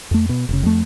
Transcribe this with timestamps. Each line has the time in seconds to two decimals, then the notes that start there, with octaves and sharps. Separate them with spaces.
0.11 F2 A3
0.29 B2
0.49 F1 C#3
0.63 F2 A3